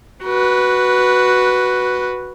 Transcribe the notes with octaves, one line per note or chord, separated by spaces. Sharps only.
F#4 B4